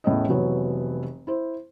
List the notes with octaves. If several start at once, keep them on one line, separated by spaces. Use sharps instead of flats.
E2 A2 C#4 D#5
F1 E3 F#3 B3 C#5
E4 C5